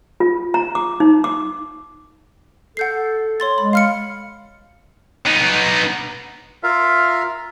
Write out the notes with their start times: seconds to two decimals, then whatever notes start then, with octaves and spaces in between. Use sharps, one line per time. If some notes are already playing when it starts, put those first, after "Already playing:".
0.20 F4
0.54 A#5
0.75 D6
1.00 D#4
1.24 D6
2.77 A4 F#5 G6 C7
3.40 C#5 C6 A6
3.58 G#3 B5
3.73 F5 F6 C#7
5.26 B3 D#4
6.63 F4 A#4 E5 F5